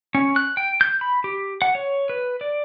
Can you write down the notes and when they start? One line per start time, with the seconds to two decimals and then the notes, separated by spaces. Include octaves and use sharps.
0.15 C#4
0.36 F#6
0.57 G5
0.81 G6
1.01 B5
1.24 G4
1.62 F#5
1.75 C#5
2.09 B4
2.41 D5